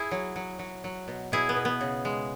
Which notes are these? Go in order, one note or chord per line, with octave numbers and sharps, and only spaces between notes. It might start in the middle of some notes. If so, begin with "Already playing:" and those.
Already playing: E4 G#4
F#3
F#3
F#3
F#3
B2
B2 E4 G#4
B3
B2
B3
C#3
G#3